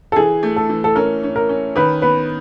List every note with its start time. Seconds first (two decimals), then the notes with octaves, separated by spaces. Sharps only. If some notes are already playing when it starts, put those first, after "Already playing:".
0.12 A4
0.16 E3 G#4
0.43 A3
0.56 A4
0.70 E3
0.84 A4
0.95 C#4 A#4
1.23 C#4
1.36 A#4
1.49 C#4
1.76 D#3 B4
2.02 B3 B4